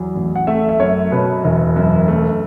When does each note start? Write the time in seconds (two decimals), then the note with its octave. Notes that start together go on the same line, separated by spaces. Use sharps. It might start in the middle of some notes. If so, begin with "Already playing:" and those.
Already playing: E2 F#3
0.15 A1
0.36 F#5
0.47 A3 E5
0.69 E5
0.80 F#2 C#5
1.12 B2 B4
1.44 E1
1.76 F#2
2.08 A3